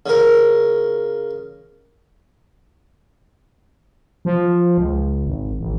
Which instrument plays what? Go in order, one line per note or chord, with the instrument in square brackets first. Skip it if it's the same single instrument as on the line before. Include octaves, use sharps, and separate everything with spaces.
[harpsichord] C#3 A#4
[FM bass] F3
C#2
G#1
A1